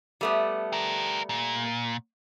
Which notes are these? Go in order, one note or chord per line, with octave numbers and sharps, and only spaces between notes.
G3 A3 B3
G4 A#4
A#2